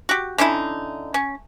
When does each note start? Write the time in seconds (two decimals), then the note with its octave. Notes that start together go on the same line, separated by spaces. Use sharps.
0.09 F#4 G4
0.38 D3 C#4 D#4 E4
1.14 C#4